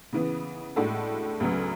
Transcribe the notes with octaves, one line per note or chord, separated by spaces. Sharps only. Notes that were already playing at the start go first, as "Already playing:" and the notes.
C#3 E3 B3
A2 G#3 D4 F#4 A4
D2 C#3 F#3 B3